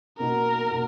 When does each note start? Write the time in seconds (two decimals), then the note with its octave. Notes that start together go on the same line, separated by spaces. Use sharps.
0.18 B2 A#3 D#4 F#4 A#4
0.71 B2 A#3 D#4 F#4